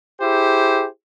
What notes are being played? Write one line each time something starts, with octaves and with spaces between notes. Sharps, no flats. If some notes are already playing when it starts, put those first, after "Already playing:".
E4 G4 G#4 C5